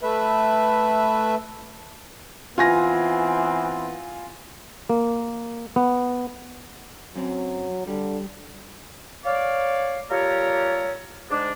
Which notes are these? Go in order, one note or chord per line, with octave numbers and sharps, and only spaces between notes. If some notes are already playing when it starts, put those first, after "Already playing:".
A3 B4 E5
E3 B3 C4 F4 G#5 A#6
A#3
B3
F#2 F#3 C4
D3 G3
C#5 D5 F5
G3 F4 G4 A4 A#4 C#5
G#2 G#3 D4